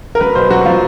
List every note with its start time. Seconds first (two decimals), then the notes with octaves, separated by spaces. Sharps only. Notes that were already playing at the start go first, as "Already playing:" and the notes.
0.15 A#4
0.20 F#3 B4
0.35 B2 C5
0.50 F#3 F#4
0.65 F#3 F4